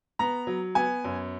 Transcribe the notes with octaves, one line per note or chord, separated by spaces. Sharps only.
B3 A#5
F#3
B3 G#5
F#2